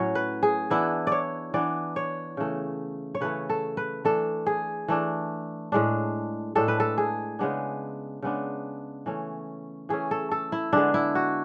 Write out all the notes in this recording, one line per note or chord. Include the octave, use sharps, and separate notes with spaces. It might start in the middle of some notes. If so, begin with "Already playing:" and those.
Already playing: A2 F#3 C#4 C#5
B4
G#4
E3 B3 D4 E4
C#5 D5
E3 B3 D4 D5
C#5
C#3 E3 A3
C#5
C#3 E3 A3 B4
A4
B4
E3 A3 D4 A4
G#4
E3 A3 D4
A2 G#3 D4
A2 G#3 D4 A4
B4
A4
G#4
C#3 G#3 B3 D4
C#3 G#3 B3 D4
E3 A3 C#4
E3 A3 C#4 G#4
A4
A4
E4
D3 G#3 B3 D4
E4
F#4